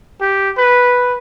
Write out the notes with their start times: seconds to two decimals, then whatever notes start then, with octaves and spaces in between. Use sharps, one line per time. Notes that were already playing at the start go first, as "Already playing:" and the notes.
0.21 G4
0.57 B4